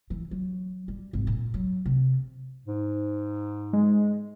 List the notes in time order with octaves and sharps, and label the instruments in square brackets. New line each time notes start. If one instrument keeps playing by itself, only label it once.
[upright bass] E3
F#3
G3
G#1
A#2
F#3
C3
[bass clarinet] G#2
[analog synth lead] G#3